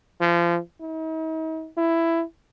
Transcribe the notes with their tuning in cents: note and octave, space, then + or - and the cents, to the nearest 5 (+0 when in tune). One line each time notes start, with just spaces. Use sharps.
F3 -30
D#4 +45
E4 +10